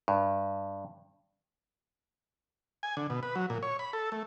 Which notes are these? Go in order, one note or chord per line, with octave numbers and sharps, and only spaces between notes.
G2
G#5
D3
B2
B4
F#3
A#2
C#5
B5
A4
A3